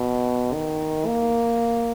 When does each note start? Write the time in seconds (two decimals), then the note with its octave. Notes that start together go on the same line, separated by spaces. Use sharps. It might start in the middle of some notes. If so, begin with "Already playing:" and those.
Already playing: B2
0.53 D#3
1.06 A#3